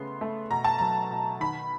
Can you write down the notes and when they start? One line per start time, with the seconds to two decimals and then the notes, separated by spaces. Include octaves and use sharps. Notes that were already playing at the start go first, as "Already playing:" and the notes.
Already playing: C#3 A3 B3 C6
0.21 A3
0.50 B2 A#5
0.64 A5
0.79 F#3 A#5
1.10 B2
1.40 D#3 B5